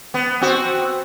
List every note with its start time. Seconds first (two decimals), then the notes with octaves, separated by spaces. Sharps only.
0.14 B3
0.41 C4 F#4